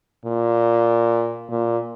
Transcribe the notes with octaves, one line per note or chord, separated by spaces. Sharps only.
A#2
A#2